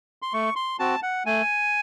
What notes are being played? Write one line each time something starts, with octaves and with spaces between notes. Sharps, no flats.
C6
A3 C#6
C6
C4 F#4 A5
F#5
A3 G#5